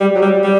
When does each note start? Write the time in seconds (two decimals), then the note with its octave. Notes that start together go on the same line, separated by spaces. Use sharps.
0.01 G3
0.15 F#3
0.22 G3
0.44 G3